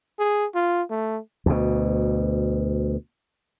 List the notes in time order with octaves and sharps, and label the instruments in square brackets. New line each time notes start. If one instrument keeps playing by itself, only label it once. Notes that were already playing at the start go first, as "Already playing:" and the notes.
[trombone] G#4
F4
A3
[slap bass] D2 B2